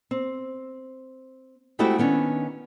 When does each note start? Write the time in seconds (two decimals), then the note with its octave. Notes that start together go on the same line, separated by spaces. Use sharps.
0.11 C4
1.79 G#3 A3 C4 E4 F#4 G4
1.98 D#3 B3 C#4 D4